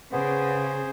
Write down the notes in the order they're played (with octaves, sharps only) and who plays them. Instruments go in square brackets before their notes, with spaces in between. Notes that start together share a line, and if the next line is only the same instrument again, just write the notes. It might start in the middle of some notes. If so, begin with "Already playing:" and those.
[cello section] C#3 [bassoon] B3 [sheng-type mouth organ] G#4 C5